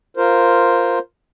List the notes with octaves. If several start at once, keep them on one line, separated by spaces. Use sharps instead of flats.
F4 A#4 C5